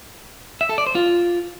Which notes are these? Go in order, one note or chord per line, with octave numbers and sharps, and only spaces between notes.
E5
A4
D5
C5
F4